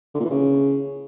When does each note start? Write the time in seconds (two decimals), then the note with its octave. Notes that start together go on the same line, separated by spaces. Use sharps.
0.14 D3
0.20 A#2
0.25 E3
0.30 C#3